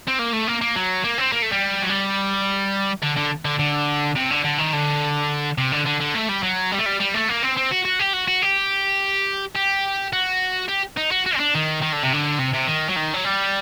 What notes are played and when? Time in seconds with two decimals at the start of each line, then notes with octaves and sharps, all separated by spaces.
0.08 C4
0.19 A#3
0.33 A3
0.47 A#3
0.61 A#3
0.76 F#3
1.04 A#3
1.18 C4
1.32 A#3
1.42 A3
1.52 G3
1.82 F#3
1.89 G3
3.03 D3
3.17 D3
3.45 D3
3.59 D3
4.16 C3
4.31 D3
4.44 D3
4.58 D#3
4.73 D3
5.58 C3
5.72 D3
5.86 D3
6.01 D3
6.15 A3
6.29 G3
6.43 F#3
6.72 G3
6.78 A3
6.86 G3
7.00 G3
7.14 A3
7.28 A#3
7.43 C4
7.57 C4
7.71 F#4
7.85 F#4
7.99 G4
8.13 F#4
8.28 F#4
8.42 G4
9.56 G4
10.13 F#4
10.69 G4
10.97 D#4
11.11 F#4
11.26 F#4
11.35 C4
11.40 D4
11.54 D#3
11.82 D#3
11.93 D3
12.03 C3
12.13 D3
12.39 C3
12.53 C3
12.67 D#3
12.89 F#3
12.96 D#3
13.14 F#3
13.24 G3